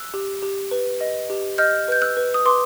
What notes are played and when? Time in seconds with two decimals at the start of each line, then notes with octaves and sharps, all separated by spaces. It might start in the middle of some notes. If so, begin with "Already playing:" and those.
Already playing: E6 F#6
0.14 G4
0.43 G4
0.71 B4
1.01 D#5
1.30 G4
1.58 D#5 F6 G6
1.88 B4 G6
2.02 E6 F#6
2.17 B4
2.34 D#6
2.45 B4 C6 D6